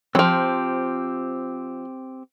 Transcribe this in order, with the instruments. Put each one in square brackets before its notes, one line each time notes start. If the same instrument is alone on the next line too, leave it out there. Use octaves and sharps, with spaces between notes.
[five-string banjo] F3 F#3 [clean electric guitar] C4 G4